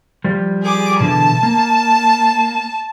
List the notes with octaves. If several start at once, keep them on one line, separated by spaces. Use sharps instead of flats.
F3 G3
G#4 D6
B2 D3 E3 A5
A#3